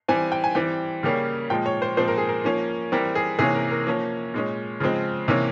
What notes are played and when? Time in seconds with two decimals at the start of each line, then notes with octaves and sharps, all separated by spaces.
0.08 E3 G3 C4 G#5
0.32 G5
0.44 G#5
0.55 E3 G3 C4 G5
1.03 C#3 G3 A#3 C#4
1.50 A#2 F3 G#3 G5
1.66 C#5
1.82 C5
1.97 A#2 F3 G#3 C4 C5
2.08 A#4
2.18 G#4
2.29 A#4
2.44 F3 A#3 C#4
2.92 E3 G3 C4 A#4
3.15 G#4
3.39 C3 E3 A#3 C#4 G#4
3.55 A#4
3.71 A#4
3.87 F3 A#3 C#4
4.34 A#2 G#3 C#4
4.80 C#3 F3 G#3 C4
5.28 C3 E3 A#3 C#4